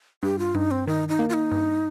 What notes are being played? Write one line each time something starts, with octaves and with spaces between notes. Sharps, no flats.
G2 G4
F4
G2 D#4
C4
D#3 D#4
D#4
A#3
F4
D#4
G2